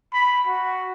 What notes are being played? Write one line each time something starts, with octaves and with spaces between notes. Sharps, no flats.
B5
F#4